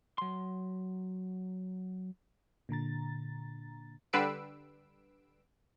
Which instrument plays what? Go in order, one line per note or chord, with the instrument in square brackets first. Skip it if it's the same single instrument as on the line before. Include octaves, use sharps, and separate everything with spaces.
[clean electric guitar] F#3 C6
[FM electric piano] A#2 D3 A#5 A6
[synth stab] D3 G3 B4 E6 C7 D7